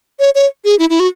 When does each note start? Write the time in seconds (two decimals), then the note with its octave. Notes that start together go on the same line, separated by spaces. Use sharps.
0.20 C#5
0.35 C#5
0.65 G#4
0.79 E4
0.90 E4
1.00 F#4